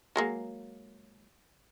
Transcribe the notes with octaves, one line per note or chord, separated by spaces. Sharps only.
F#3 G#3 A#3